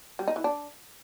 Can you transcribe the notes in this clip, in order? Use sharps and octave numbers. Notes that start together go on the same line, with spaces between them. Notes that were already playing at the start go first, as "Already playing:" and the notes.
G3
D#4
E3
D4